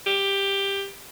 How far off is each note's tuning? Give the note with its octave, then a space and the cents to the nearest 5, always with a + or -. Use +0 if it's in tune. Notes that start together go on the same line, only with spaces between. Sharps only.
G4 +10